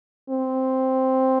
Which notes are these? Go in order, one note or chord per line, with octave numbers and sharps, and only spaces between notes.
C4